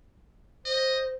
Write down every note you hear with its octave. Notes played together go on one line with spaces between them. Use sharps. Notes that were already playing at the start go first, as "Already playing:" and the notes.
C5 D#5